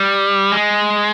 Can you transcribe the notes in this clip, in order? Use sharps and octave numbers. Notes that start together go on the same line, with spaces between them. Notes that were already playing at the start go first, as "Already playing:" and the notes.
Already playing: G3
G#3